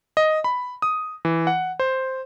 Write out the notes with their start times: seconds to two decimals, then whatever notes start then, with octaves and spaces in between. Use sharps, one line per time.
0.17 D#5
0.44 B5
0.82 D#6
1.25 E3
1.47 F#5
1.79 C5